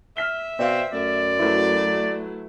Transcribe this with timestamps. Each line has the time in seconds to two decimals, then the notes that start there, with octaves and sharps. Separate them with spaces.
0.17 E5 F6 B6 G7
0.59 B2 C4 D5 F5
0.93 F#2 A3 D5
1.39 F#3 A3 E4 B4